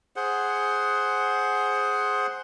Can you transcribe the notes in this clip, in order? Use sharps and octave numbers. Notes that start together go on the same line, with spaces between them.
G#4 C5 F#5